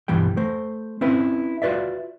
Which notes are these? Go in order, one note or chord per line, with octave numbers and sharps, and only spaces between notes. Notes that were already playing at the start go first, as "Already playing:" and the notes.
B1 G2 E3 G3 G5
A3 C5
C4 C#4 E4 B4
F4 F#4 B4 D5 E5